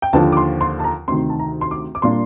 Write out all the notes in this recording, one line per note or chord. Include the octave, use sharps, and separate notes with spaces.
G5
D#2 D3 F3 A5
D6
C6
C6
A5
A#5
D2 C3 D#3 C6
A5
A#5
C6
D6
D6
A#2 G3 A#3 D4 C6